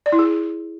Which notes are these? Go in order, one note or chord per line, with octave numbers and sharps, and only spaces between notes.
D5
E4
G#4